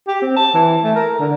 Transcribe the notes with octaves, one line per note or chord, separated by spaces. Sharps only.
G4
C4
A5
E3
A3
A#4
D3